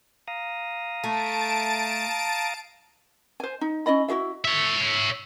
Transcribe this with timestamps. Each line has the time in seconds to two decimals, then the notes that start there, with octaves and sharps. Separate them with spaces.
0.28 F5 A#5 D#6
1.04 A3 A5 D7
3.40 C5 G#5
3.61 D#4
3.86 C#4 E4 D#5 B5
4.08 E4 F#4 G#4 E5
4.45 C#5 E5